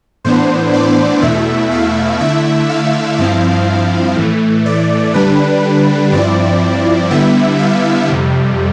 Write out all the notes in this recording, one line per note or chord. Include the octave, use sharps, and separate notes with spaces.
A2 E3 B3 D4 C5
D5
E2 B2 A3 E4 E5
F5
D3 A3 E4 E5
F5
G2 F3 C4 E4 F5
A2 E3 A3
D5
D3 G3 D4 B4
G2 F3 C4 E4 D5
D3 G3 B3 E4 E5
F5
F2 C3 G3